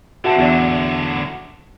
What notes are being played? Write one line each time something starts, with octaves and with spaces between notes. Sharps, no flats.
D3 C4 F#4 E5 A5
E2 D3 F#3 D4